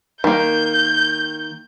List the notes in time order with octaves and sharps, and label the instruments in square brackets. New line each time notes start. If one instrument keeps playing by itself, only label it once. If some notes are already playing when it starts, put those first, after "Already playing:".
[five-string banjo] D#3 A#3 [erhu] G6